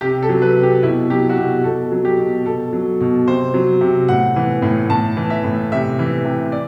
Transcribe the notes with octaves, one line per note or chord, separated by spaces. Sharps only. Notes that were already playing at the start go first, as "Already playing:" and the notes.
C3 G4
A4
F#3
B4
C3
G4
B2 E4
F#3 G4
F#4
B2 G4
B2 A4
F#3
G4
B2
B2 A4
F#3
B2
C3 C5
F#3
C3
A2 F#5
E3
A2
A2 A5
E3
E5
A2
C3 E5
E3
C3
D5